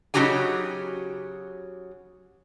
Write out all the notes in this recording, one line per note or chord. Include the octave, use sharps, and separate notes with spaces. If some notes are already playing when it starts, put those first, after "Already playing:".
C#3 F#3 D#4 F#4 G4 G#5